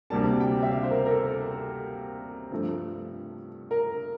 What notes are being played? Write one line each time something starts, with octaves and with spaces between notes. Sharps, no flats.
D2 C3 G3 A#3 A5
G5
E5
F5
C5
A#4
A#4
A4
A4
G2 F3 A3
A#4